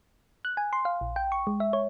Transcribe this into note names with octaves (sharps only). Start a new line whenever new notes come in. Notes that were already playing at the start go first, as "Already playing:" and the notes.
F#6
G#5
C6
F5
A#1
G5
C#6
G#3
E5
C#5